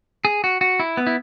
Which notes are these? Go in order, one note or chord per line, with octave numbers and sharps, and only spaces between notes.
G#4
F#4
F#4
E4
B3
E4